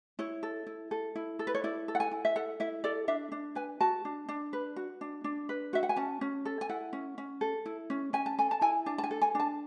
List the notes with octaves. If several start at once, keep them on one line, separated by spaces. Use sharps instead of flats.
E4 C#5
A4
E4
A4
E4
A4
B4
C#5
E4 D5
A4
F#5
G#5
E4
E5
A4 F#5
E4 E5
A4 D5
D4 E5
D4
B4 G#5
F#4 A5
D4
D4
B4
F#4
D4
D4
B4
F#4 E5
F#5
G#5
C#4 A5
C#4
A4
G#5
E4 F#5
C#4
C#4
A4
E4
C#4
C#4 G#5
A5
A4 G#5
A5
E4 G#5
D4 A5
A5
G#5
A4
G#5
D4 A5